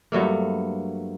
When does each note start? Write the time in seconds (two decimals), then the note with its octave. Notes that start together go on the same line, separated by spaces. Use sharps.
0.12 G2 F#3 A3 A#3